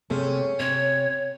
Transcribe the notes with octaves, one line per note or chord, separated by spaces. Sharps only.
C3 A3 C#4 G#4
C3 C#5